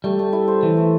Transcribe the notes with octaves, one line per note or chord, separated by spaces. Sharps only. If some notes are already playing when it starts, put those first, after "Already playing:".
G3 A3
A3
E4
C5
E3 A3
A3